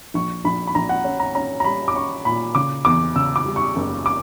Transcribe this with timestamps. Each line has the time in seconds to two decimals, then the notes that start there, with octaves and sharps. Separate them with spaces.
0.14 A#1 C#6
0.45 A#1 B5
0.67 B5
0.75 A#1 A#5
0.89 F#5
1.04 C#4
1.20 A#5
1.35 C#4 A#5
1.60 A#5
1.64 G3 B5
1.88 D6
1.95 C#4 C#6
2.25 A#2 B5
2.55 C#3 D6
2.85 E2 D6
3.16 C#3 E6
3.36 D6
3.46 G3
3.56 C#6
3.76 F#1
4.06 D6